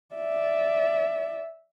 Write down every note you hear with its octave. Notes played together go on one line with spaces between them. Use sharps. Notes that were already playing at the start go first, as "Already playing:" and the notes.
D5 E5